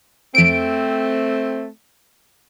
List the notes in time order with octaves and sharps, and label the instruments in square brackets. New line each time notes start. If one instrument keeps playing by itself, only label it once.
[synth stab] F2 D7 [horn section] A3 C4